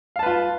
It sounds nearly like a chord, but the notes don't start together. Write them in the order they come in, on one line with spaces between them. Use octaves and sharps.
F5 A5 B4 F4